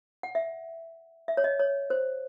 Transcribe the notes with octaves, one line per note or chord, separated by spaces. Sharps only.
F#5
E5
E5
C#5
D#5
C#5
C5